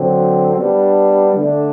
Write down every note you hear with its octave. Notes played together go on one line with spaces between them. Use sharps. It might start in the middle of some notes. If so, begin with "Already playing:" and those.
Already playing: D3 F#3 C4
G3 B3 D4
D3 A3 D4